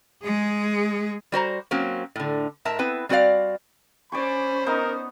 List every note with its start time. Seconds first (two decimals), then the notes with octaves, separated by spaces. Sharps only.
0.24 G#3 G#4
1.32 G3 F#4 C5 A#5
1.71 F#3 A#3 C4 C#4
2.16 A2 D3
2.65 G#2 A#4 E5 A5
2.79 B3 C4 E4 B4
3.09 G3 C4 F#4 C#5 D5 F5
4.12 C#4 C5 D5 G#5 B5 C#6
4.67 B3 D#4 A#4